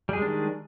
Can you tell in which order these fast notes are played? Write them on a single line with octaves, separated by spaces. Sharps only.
G3 G#4 G#3 D4 D#3